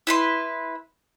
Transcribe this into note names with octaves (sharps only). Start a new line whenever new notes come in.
E4 B4 C6